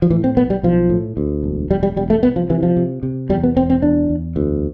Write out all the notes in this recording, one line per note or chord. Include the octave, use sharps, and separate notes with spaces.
F3
A2 E3
C4
B1 B3
G3
B1 F3
A2
D2
E1
E1 G3
G3
E1 G3
A3
C2 B3
F3
C3 E3
F3
C3
C3
E2 G3
B3
E1 C4
C4
E2 D4
E2
D2